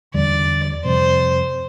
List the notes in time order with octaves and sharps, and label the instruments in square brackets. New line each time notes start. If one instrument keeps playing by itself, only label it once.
[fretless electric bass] E2 D3 G3 [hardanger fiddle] D5
[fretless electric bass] F2 C3 G3 [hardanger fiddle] C5